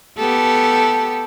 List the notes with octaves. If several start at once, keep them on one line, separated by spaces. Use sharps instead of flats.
B3 G4 A4